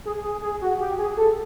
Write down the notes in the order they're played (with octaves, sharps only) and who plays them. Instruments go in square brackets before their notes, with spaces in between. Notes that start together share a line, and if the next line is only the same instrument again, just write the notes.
[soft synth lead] G#4
G#4
G#4
F#4
G4
G#4
A4